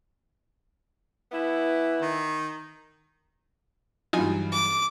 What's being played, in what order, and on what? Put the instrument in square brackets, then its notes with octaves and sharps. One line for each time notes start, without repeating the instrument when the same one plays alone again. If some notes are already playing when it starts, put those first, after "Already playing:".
[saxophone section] E3 B3 E4
[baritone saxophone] D#3
[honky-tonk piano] G2 E3 F#3 [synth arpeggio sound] D#4 F4 G#5
[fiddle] D6